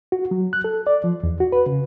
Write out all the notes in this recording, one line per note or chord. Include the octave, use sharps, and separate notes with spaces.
F#4
F#3
F#6
A4
D5
F3
E2
F#4
B4
C#3